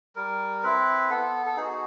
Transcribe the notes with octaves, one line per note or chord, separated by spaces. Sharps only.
G3 A#4
C4 E4 B4
B3 A4
A4
D#4 F#4 G#4